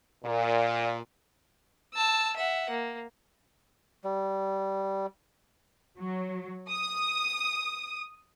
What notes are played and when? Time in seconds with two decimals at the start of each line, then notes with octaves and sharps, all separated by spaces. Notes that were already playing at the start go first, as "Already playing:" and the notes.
0.24 A#2
1.95 A5 E6
2.36 E5 F#5
2.70 A#3
4.04 G3
5.98 F#3
6.68 D#6